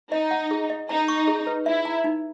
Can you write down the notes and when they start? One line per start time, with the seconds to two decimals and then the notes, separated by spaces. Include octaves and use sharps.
0.12 D#4 D#5
0.31 F#5
0.51 G#4
0.70 D#5
0.89 D#4 A#5
1.08 C#6
1.27 G#4
1.47 B4
1.66 E4 E5
1.85 A#5
2.04 D#4